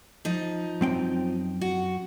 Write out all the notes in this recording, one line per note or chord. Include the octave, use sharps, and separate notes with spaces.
F3 D#4
F#2 C4 G5
F#4